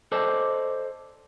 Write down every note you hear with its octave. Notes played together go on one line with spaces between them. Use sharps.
A4 C5 D5 D#5 A5